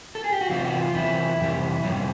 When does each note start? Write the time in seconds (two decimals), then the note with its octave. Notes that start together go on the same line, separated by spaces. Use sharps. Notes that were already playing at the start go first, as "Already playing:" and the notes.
0.15 A4
0.24 G#4
0.32 G4
0.41 F#4
0.49 E2 C3 F3 F4
0.65 F#4
0.79 F4
0.94 E2 C3 F3 E4
1.40 F2 C3 E3 G3
1.84 F2 C3 E3 G3 C#4